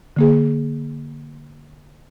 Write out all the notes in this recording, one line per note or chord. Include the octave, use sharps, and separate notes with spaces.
D3 A#3 G#4